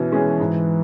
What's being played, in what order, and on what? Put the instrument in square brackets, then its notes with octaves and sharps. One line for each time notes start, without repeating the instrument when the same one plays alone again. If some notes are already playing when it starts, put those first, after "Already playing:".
Already playing: [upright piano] B2 C#4 [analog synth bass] E3
[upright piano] G#3 C#4 G#4
G#2